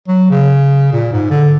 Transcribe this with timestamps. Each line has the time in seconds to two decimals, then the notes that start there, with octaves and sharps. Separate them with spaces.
0.08 F#3
0.30 C#3
0.93 A#2
1.13 G#2
1.30 D3